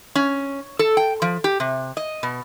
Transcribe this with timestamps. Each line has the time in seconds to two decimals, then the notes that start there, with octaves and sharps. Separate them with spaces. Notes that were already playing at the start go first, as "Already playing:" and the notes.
0.15 C#4
0.79 A4
0.97 G5
1.22 F3
1.44 G4
1.60 C3
1.97 D#5
2.23 B2